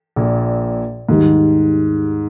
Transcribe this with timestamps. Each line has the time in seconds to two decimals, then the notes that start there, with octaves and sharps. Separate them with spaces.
0.16 A#1 A#2
1.09 D#2 G#2 D#3 G3